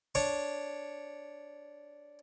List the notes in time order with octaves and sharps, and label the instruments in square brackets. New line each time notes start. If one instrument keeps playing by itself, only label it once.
[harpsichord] D4 C#5 C#6